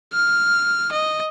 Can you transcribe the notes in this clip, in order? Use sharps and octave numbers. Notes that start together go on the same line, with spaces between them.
F6
D#5